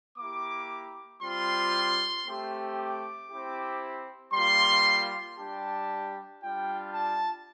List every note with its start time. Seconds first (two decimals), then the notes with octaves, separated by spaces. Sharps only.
0.17 A#3 E4 G4 D6
1.21 G3 C4 F4 C6
2.25 A3 C4 G4
2.78 D6
3.29 C4 E4 G4
4.33 G3 A#3 F4 C6
5.37 G3 D4 G4 A5
6.41 G3 D4 F4 G5
6.94 A5